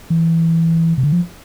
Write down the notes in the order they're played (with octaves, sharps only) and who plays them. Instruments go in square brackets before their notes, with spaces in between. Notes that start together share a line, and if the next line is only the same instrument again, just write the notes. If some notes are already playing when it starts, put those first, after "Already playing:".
[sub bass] E3
C3
D3
F3